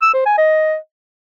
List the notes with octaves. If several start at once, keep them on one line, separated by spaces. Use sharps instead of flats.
E6
C5
G#5
D#5